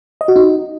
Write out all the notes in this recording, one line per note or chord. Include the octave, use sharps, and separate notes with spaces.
D#5
F#4
D#4